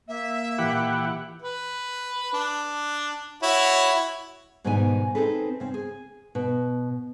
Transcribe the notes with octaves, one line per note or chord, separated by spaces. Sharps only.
A#3 E5
A#2 E3 E4 G4 F#5
B4
D4
E4 F#4 C#5
G#2 B2 D#3 G3 D4 G#5
C4 C#4 D#4 G#4 A4 B4
C#3 C4
G#4
B2